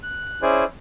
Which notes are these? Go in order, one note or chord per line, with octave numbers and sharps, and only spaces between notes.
F#6
C#4 E4 G#4 C5 D5 G#5